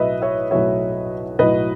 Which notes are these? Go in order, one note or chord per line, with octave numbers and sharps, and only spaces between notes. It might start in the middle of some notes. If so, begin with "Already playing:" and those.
Already playing: B1 A2 F#3 B4 D#5 E5
C#5 E5
B1 A2 F#3 C#5 E5
B1 A2 F#3 B4 D#5